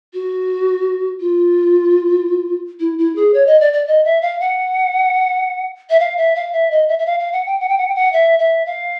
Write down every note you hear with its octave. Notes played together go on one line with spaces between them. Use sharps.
F#4
F4
E4
E4
G#4
C#5
D#5
D5
D5
D#5
E5
F5
F#5
E5
F5
E5
F5
E5
D#5
E5
E5
F5
F5
F#5
G5
F#5
G5
F#5
G5
F#5
E5
E5
F5